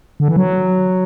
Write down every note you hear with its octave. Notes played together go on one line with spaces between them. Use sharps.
D3
E3
F#3